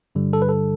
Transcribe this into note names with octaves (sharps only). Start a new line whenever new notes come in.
G2 D3 G3
A4
B4
A4